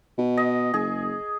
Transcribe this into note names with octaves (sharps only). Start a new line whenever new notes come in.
B2
D#5
F#1 G#4